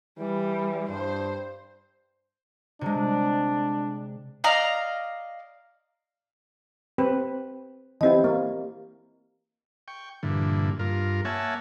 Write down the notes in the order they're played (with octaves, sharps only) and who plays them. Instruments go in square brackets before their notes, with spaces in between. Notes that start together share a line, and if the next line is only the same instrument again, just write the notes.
[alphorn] E3 [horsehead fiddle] G3
[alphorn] G2 [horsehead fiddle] C5
[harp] C3 G#3 [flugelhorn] D4
[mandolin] D5 D#5 F5 A#5
[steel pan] C4 G4 B4
[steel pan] E3 C4 E4 [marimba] G4 D#5
[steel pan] A#3
[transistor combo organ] G5 C#6
G2 A#2 D3 E3
G2 F4 A#4
A#3 C#5 E5 F#5 G#5 A5